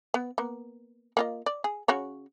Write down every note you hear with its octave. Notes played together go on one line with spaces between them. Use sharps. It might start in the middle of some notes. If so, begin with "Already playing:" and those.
B3
A#3 B3
A#3 F4 D#5
D5
G#4
C#3 F#4 C#5